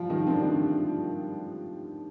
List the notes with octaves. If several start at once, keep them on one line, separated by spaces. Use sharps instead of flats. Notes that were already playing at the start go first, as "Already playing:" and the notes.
Already playing: F3 G3 F4
D#3 D#4
C4
D3 D4